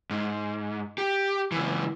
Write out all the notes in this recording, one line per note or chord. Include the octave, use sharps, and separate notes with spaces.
G#2
G4
C#2 E3